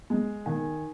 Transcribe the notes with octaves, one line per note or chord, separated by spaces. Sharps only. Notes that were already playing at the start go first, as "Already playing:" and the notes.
G#3
D#3 G#5